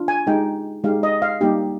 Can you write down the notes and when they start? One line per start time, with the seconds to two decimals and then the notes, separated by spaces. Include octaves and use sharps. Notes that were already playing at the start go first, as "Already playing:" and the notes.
Already playing: D4 F4
0.08 G#5
0.27 G#3 D#4 G4 G5
0.84 G#3 D#4 G4 F5
1.03 D#5
1.22 F5
1.41 G3 A#3 D#4 G4